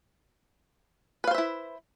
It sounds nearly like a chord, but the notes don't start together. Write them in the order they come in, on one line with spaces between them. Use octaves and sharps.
B4 F5 C5 E5 E4